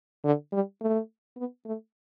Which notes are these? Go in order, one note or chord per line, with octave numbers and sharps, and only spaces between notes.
D3
G3
A3
B3
A3